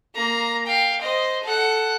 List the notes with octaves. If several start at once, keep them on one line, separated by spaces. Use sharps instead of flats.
A#3 A#5
F5 G5
C5 D#5
A4 F#5